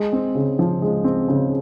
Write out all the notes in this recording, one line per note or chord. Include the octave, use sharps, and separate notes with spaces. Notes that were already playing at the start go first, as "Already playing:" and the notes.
Already playing: G#3
C4
C#3
F3
G#3
C4
C#3